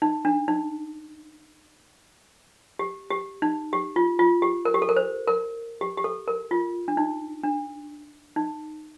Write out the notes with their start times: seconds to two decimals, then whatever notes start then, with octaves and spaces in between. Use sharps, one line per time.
0.02 D#4
0.25 D4
0.48 D#4
2.79 G4
3.11 G4
3.42 D#4
3.73 G4
3.96 F4
4.19 F4
4.42 G4
4.65 A#4
4.74 G4
4.82 A4
4.89 A#4
4.96 C5
5.27 A#4
5.81 G4
5.97 G4
6.04 A4
6.28 A#4
6.51 F4
6.88 D4
6.97 D#4
7.44 D4
8.36 D#4